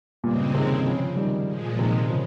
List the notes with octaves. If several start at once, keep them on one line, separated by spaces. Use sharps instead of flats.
G2 A#2 C#3 G#3 C4
C3 D#3
C#3 F3
D#3 G3
A#2 F3 G#3
C3 D#3
C#3 F3